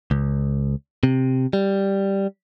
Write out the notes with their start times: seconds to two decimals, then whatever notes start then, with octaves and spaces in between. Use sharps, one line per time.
0.11 C#2
1.03 C3
1.53 G3